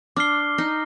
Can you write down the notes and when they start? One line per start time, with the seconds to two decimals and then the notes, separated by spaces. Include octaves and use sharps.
0.16 D4 D6 F6 C7 G7
0.58 D#4